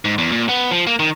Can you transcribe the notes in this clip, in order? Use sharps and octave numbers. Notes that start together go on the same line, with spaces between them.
G#2
E2
A#2
B3
F3
A#3
D#3